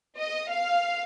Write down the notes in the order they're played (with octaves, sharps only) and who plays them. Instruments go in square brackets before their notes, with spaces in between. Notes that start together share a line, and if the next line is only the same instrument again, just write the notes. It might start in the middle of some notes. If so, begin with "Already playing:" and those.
[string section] D#5
F5